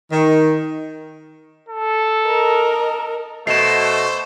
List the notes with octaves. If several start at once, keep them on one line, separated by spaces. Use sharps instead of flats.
D#3
A4
A#4 D#5
B2 A3 A4 C5 C7 E7